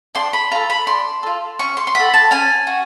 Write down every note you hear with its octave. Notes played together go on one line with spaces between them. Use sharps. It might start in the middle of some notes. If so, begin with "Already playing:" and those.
D4 C6
B5
F4 A4 A#5
B5
D4 C6
F4 A4
C#4 C#6
C6
C6
F#4 A4 B5
A5
C#4 G#5
F#4